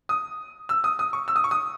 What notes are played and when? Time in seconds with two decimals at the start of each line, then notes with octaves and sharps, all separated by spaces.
0.09 D#6
0.69 E6
0.84 D#6
0.99 D#6
1.13 C#6
1.28 E6
1.36 D#6
1.44 C#6
1.51 D#6